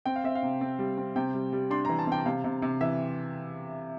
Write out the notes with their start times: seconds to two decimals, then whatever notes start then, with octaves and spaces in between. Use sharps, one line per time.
0.06 C4 G5
0.16 F5
0.24 C4 E5
0.35 F5
0.43 C3
0.61 C4
0.79 G3
0.98 C4
1.16 C3 G5
1.34 G3
1.53 G3
1.71 D4 C6
1.85 E3 A#5
1.99 A5
2.07 C3 G5
2.26 C3 F5
2.44 C3
2.62 C3
2.81 E3 E5